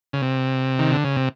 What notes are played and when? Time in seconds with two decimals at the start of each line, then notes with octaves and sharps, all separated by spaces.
0.13 C#3
0.22 C3
0.79 D#3
0.92 D3
1.04 C#3
1.16 C3